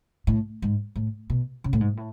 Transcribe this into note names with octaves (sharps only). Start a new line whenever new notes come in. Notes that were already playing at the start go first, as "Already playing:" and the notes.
A2
G#2
A2
B2
C#3
A2
G#2
A2